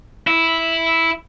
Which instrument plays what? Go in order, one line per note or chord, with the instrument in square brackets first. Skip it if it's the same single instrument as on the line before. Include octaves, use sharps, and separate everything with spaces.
[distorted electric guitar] E4